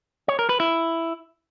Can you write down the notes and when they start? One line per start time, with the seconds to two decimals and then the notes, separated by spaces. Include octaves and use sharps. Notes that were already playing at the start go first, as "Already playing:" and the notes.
0.28 C#5
0.39 A#4
0.49 B4
0.60 E4